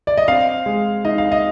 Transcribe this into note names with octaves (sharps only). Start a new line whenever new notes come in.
D5
D#5
C4 F5
G#3
D#4 D#5
F5
D#5